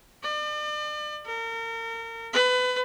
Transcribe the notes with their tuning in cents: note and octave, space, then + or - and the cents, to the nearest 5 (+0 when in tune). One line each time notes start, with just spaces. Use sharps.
D5 +40
A#4 -35
B4 +25